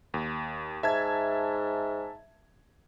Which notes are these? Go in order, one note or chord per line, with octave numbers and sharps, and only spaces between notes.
D#2
G#2 E5 A5 G#6